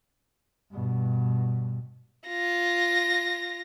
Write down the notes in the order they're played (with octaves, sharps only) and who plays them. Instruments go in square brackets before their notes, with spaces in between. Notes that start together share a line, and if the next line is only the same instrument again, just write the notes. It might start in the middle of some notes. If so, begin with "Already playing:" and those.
[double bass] G2 B2
[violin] F4 A#6